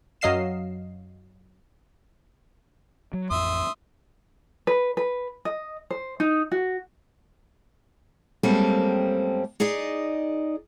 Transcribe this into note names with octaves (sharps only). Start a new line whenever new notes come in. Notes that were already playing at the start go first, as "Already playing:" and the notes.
F#2 F#3 D#5 F5 C7 E7
F#3
A1 F2 E5 C6 D#6
B4
B4
D#5
C5
D#4
F#4
F#2 G3 G#3 A#3 C4 A4
D#4 G#4 D5 D#5